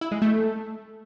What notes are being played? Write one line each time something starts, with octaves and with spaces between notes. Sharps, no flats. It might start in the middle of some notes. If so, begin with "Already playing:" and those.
E4
G#3
A3